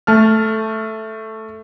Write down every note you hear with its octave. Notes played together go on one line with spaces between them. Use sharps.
A3 A5 F6